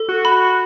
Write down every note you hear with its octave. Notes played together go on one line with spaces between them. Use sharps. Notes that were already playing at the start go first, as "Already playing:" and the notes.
Already playing: A4
F#4
B5
F#4